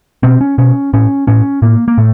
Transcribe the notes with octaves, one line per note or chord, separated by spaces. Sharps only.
B2 C4
C#4
B2 C#4
A2 C#4
A2 C#4
A2 A#3
A#3
A2 A3